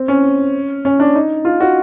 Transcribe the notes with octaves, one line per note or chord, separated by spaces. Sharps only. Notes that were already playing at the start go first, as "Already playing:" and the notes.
Already playing: C4
C#4
C#4
D4
D#4
F4
F#4